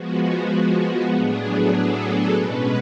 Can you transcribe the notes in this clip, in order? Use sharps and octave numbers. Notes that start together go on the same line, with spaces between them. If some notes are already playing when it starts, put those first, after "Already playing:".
Already playing: F3 G#3 B3 F#4
F#4
A2 F#3 B3 D4 G#4
A4
A4
B2 G#3 C#4 B4